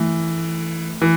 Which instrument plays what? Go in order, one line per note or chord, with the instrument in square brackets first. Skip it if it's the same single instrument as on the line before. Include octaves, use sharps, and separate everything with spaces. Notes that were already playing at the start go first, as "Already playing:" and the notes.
Already playing: [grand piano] E3 [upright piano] A3
[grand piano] E3